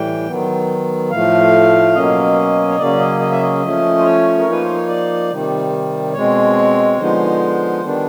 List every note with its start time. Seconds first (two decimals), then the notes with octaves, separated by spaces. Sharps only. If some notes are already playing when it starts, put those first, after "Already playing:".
Already playing: A2 E3 G3 G5
0.27 D#3 F#3 B3
1.11 A2 F3 A3 F5
1.94 B2 F#3 A#3 C#4 D#5
2.68 C#5
2.78 C#3 F#3 A#3 C#4 D5
3.00 D#5
3.20 D#5
3.31 E5
3.42 D#5
3.62 F3 A3 C#4
3.99 C5
4.04 C#5
4.39 A#4
4.46 F3 A#3 D#4 B4
4.64 C5
4.76 C#5
4.88 D5
5.30 C3 D#3 G3
6.14 B2 G#3 C4 C#5
6.98 D3 F3 G#3 B3 D#4 C5
7.81 D#3 G3 B3 D4